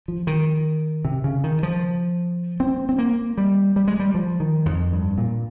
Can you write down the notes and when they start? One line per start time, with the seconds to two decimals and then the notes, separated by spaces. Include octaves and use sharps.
0.08 F3
0.27 D#3
1.05 C3
1.24 C#3
1.44 D#3
1.63 F3
2.60 C4
2.89 C4
2.98 A#3
3.38 G3
3.76 G3
3.88 G#3
4.00 G3
4.15 F3
4.40 D#3
4.66 F2
4.93 G2
5.18 A#2